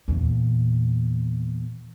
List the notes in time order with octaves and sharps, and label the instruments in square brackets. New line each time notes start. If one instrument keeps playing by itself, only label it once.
[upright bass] E2 A#2